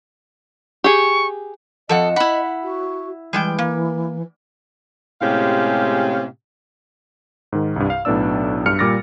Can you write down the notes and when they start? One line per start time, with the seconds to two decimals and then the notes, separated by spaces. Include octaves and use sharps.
0.84 G4 G#4 C#6
1.89 F2 F3 A4 D#5 F#5
2.16 E4 F#5 B5
2.64 F#4
3.33 E3 G3 G#3 G5
3.59 A#3
5.21 A2 C3 G#3 C#4 G4 F5
7.52 G#2 D#3
7.76 C2 G2
7.90 F5
8.05 B1 A2 B3 D4 D5 E6
8.66 G2 F6 C#7
8.79 A#2 G3 D6 F6 A6 A#6